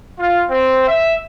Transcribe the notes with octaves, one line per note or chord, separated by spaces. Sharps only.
F4
C4
E5